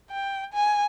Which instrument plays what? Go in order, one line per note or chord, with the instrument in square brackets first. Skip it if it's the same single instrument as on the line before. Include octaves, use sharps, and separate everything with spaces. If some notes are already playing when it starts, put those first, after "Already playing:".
[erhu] G5
G#5